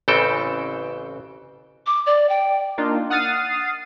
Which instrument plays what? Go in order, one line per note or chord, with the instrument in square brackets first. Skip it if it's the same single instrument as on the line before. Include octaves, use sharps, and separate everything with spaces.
[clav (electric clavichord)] A1 C#3 E3 C4 A4 G5
[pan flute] D6
D5
G5
[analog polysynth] A#3 D4 D#4 F4
F#5 D#6 F6 A6 C7 D#7